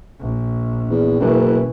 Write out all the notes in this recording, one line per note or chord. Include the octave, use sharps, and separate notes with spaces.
A#1
E2
F#1 B2 E3